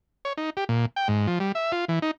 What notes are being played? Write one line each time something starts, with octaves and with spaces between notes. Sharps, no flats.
C#5
D#4
G4
A#2
G5
G#2
F3
G3
E5
F4
E3
D#4